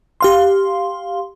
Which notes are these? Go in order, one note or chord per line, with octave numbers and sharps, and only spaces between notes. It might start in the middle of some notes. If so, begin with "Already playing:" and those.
G4 F5 C6